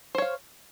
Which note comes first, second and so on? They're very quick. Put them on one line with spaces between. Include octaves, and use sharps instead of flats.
C5 C#5 F5